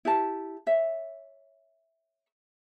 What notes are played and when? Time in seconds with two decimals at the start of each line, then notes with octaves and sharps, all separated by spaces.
0.05 E4 G4 A5
0.67 C#5 E5